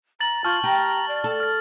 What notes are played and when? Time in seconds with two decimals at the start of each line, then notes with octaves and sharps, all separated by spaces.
0.21 A#5 A6 F#7
0.44 F4 A5 C#6 F6 G6
0.64 G4 A#5
1.09 D5
1.24 A4
1.40 F6 A6